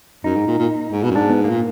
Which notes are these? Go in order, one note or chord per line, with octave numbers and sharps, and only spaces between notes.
F#2 D#4
G#2
A#2
A#2
G#2
B2
F#2
G#2 D4
B3
A#3
A#2